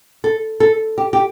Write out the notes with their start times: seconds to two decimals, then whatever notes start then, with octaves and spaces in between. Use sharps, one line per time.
0.24 A4
0.60 A4
0.98 G4
1.13 G4